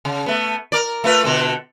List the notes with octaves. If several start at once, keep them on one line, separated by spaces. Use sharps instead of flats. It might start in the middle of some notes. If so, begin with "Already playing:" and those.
C#3
A3 B3
A#4 D5
A3 F4 B4
B2 D3 A4